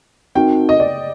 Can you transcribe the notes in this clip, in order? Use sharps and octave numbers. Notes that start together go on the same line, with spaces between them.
C4 D#4 F#4 A#4 G5
D#5
D5